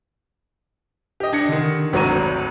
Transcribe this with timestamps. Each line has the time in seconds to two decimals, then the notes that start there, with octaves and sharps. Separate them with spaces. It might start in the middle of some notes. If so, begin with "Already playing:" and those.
1.20 G4 D#5
1.33 D4 G#6 A#6 C#7
1.48 D3 D#3
1.93 G#1 D2 F#3 C#5 A#5 D#7